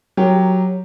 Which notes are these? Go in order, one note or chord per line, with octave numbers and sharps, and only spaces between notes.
F#3 G4 A#4